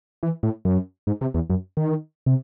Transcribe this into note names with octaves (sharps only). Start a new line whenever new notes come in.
E3
A2
F#2
G#2
C3
E2
F#2
D#3
C3